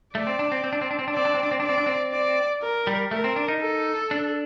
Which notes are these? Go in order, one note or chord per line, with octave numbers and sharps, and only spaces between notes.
A3 D5
C4
D4
C4
C4
D4
C4
D4
C4
D4
C4 D5
D4
C4
D4
C4
D4 D5
C4
D4
C4
D5
A#4
G3
A3 A#4
C4
D4
D#4
A4
D4